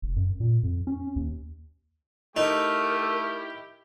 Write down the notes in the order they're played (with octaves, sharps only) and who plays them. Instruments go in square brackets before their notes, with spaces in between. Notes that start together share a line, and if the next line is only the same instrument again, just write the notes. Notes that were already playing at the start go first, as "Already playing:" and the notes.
[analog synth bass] F1
F#2
A#2
F2
C#4
D#2
[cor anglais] A3 [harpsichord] D#4 [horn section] E4 G4 [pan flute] A#4